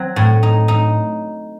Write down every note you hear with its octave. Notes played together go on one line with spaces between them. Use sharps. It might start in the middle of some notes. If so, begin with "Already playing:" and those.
Already playing: F#3 C4
A2
D#4
D#4